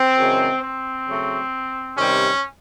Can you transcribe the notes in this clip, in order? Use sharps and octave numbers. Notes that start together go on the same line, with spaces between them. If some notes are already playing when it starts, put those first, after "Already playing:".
Already playing: C4
F#2 C#3 E3 G#3
C4
C#3 F#3 A3
C3 D#3 G3 C#4